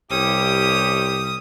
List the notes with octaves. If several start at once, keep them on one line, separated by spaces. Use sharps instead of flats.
C2 E3 C#4 G4 D#6